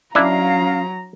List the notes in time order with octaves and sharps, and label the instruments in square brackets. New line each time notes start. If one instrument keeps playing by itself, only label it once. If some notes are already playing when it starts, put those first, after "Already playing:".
[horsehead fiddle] F#3 A#5 [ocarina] C#4 [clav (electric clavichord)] D4 E4 [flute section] F5